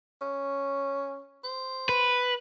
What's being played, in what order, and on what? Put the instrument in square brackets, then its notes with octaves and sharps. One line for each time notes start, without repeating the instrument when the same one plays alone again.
[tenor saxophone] C#4
C5
[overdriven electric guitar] B4